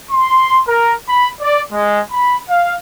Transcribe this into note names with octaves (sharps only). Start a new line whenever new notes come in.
C6
A#4
B5
D5
G#3
B5
F5